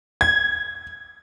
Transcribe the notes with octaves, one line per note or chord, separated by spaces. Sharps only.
G#6